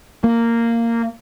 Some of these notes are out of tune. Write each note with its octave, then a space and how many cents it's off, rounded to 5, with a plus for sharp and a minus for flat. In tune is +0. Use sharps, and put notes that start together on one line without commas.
A#3 -10